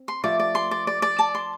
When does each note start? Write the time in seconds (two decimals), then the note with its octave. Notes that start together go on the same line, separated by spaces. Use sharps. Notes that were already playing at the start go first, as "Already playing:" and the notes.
Already playing: C4
0.08 C6
0.24 F3 A3 D5
0.39 D5
0.55 C6
0.71 D5
0.87 D5
1.02 D5
1.19 A5
1.35 C6